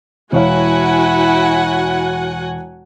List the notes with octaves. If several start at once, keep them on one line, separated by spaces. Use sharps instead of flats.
E1 E4 F#4 C#5 F5 F#5 G#5